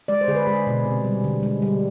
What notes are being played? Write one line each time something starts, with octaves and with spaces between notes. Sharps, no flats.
G#3 D5
C5
D3 G#4
B4
G#3 G#4
B2
C3
G3
D3
G#3
G3